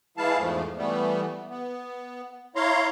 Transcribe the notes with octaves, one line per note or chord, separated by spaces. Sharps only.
E3 G#3 E4 F5 A5
E2 G#2 F3 A3
E3 G3 A3 B3
B3
E4 C#5 F5 A#5 C6